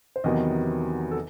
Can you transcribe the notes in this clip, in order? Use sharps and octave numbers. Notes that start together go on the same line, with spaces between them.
C5
E2 C3 D#3 F#3 B3 D#5
A4